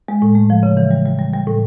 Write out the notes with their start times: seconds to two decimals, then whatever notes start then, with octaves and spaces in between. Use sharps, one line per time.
0.08 G#3
0.22 A2
0.35 A3
0.50 F3
0.63 C#3
0.77 E3
0.91 G3
1.06 G3
1.19 G3
1.33 G3
1.47 A2